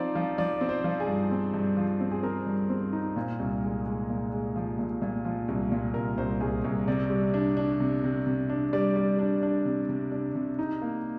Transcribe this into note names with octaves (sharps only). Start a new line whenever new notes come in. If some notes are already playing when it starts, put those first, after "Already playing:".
Already playing: F3 C4 D#4 D5
F3
F3 D5
C4
C5
F3
G#4
G2
C4
G2
F3
C4
G#4
C4 A#4
G2
C4
D#4
A#2
C2
G#3
G#3
A#2
G#3
F3
A#2
A#2
F3
C2
A#2
C2 A#4
C2 C5
C2 G#4
C2
C3 D5
G3
D4
D4
C3
C3
C3
D4
G3 D5
G3
D4
D4
C3
C3
D4
C3
D#4
A#3